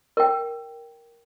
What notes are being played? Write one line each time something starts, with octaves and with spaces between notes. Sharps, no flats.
A#4 G5